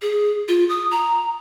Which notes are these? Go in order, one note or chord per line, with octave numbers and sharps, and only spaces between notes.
G#4
F4
D#6
A#5